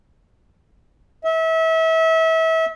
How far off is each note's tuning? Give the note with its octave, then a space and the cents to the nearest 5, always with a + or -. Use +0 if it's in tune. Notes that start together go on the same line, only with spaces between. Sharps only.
E5 -30